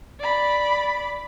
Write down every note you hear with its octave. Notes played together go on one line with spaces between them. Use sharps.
D5 B5